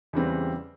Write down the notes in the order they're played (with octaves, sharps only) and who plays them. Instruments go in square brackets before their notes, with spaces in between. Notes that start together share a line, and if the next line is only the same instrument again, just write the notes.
[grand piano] E2 C#3 E3 G3 C4